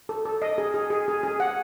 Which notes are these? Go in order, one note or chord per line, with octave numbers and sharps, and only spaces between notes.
A4
A4
D#5
G#4
G#4
G#4
G#4
G#4
F#5